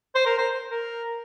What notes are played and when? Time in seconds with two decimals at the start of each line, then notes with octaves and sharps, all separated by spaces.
0.16 C5
0.26 A#4
0.38 C5
0.70 A#4